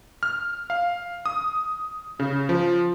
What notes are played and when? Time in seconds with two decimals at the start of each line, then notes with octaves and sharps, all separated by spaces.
0.23 F6
0.70 F5
1.26 D#6
2.19 C#3
2.49 F3